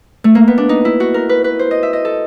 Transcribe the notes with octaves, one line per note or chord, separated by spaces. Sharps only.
A3
A#3
B3
D4
D#4
E4
F#4
A#4
B4
B4
C5
D#5
E5
D#5
A4